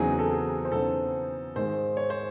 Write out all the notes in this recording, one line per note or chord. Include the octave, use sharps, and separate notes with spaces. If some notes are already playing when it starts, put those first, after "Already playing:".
Already playing: E2 C#3 F#3 C4 D#4 G#4
A4
G#4
C5
E2 C#3 F#3 C4 D#4 A4
G#2 D#3 G#3 C5
C#5
C5